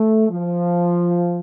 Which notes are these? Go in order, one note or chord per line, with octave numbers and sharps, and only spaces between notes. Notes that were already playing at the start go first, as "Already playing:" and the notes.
Already playing: A3
F3